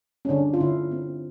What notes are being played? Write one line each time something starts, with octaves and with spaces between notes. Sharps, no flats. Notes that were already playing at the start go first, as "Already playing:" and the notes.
C#4
D3 D4
F4
D3 E4
C4